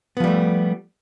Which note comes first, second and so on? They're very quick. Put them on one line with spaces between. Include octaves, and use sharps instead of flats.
B3 F3 G3 A3